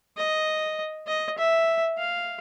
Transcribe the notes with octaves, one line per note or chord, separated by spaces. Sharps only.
D#5
D#5
E5
F5